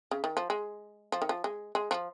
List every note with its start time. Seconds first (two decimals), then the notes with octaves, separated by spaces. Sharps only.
0.11 C#3
0.24 D#3
0.37 F3
0.50 G#3
1.12 F3
1.22 D#3
1.29 F3
1.44 G#3
1.75 G#3
1.91 F3